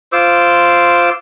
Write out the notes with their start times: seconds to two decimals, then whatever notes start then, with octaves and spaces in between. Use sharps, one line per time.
0.13 F4 C5 D6 E6